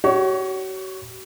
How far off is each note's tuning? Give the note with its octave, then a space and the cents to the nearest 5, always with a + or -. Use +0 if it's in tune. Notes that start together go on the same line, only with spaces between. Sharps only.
F#4 +40 C#5 +0